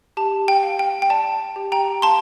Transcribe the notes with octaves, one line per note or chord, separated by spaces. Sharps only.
G4 A5
G5
F5
G5
G5
D5 A5
G4
G5 A#5
F5 A5 C6